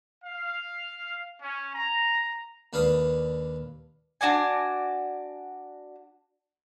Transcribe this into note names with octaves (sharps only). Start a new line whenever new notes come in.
F5
C#4
A#5
D#2 D4 B4 C#5 F5 D#6
D4 F#4 D5 G#5